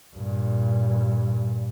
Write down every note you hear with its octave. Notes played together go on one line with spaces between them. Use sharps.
G2 A#2